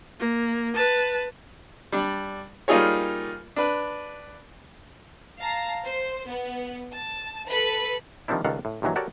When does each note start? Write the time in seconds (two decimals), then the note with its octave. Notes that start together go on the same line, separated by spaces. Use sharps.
0.19 A#3
0.74 B4 A5
1.92 G3 D4
2.68 G3 A#3 D#4 F4 G#4 C#5
3.56 D4 B4
5.39 F5 A5 A#5
5.83 C5
6.28 B3
6.91 A5
7.46 A4 B4 B5
8.28 D#3 F3 G3 C4 D4 E4
8.44 C#2 D#3 G3 A4 F5 F#5
8.65 A2
8.82 G2 A#2 D#3 E3 F#3
8.96 F#4 G4 A4 A#4 C#5 D5